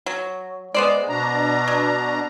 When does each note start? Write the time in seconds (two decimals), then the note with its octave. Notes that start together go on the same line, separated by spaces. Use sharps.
0.06 F#3
0.74 G#3 B3 C5 D5
1.09 B2 D4 A#5
1.67 F#3